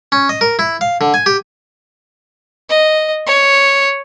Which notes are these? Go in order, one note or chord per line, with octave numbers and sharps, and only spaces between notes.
C#4
D#5
A#4
E4
F5
D3
G#5
G4
D#5
C#5